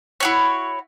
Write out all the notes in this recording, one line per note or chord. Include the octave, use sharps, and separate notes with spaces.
E4 F#4 C#5